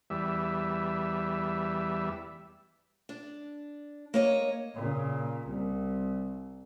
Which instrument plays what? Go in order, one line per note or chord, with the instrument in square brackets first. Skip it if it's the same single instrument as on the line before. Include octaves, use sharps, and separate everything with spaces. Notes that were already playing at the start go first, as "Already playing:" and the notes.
[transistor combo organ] E2 G3 E5
[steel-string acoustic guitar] D4
A#3 C#5 D#5
[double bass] A#2 C#3
C2